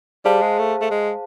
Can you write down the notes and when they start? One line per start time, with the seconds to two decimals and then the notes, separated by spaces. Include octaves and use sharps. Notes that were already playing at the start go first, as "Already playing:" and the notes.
0.25 G3 G#4 C5 F5 A5
0.42 G#3
0.59 A3
0.81 A3
0.91 G#3